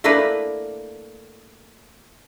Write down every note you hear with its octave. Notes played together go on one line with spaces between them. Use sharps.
A3 A#3 D4 E4 A#4 B4